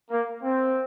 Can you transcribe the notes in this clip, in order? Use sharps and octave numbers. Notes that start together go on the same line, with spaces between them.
A#3
C4